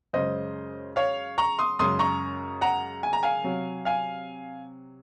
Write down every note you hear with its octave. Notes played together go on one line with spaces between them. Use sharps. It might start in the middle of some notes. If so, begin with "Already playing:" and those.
F#2 C#3 G#3 C5 D#5
C#5 F5
A#5 C#6
C6 D#6
F#2 C#3 G#3 C6 D#6
A#5 C#6
F#5 A#5
G#5
A#5
F5 G#5
C3 F#3
F5 G#5